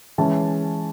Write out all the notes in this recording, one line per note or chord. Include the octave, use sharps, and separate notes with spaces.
E3 G#3 C#4 A5